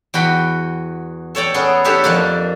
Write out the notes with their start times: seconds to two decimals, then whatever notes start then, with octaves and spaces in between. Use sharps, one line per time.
0.14 E2 F#4 G5 B5
1.35 A4 C#5 D5 G5
1.54 B3 C#4 G#4 A4
1.84 D4 G4 A4 C#5 E5
2.04 F2 A#3 D4